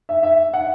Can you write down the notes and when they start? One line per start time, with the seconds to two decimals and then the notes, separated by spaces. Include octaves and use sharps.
0.09 E5
0.23 E5
0.54 F#5